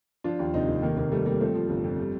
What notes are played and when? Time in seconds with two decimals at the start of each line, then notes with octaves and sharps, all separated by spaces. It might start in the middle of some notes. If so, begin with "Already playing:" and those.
0.24 F3 D4 F4
0.39 D#2
0.54 F1 C4 D#4
0.68 F1
0.82 D#3 A#3
0.97 F1 A#3
1.12 G3 A3
1.26 G3 A#3
1.40 F3 A3 C4
1.55 F3
1.69 G1
1.84 F2
1.99 G3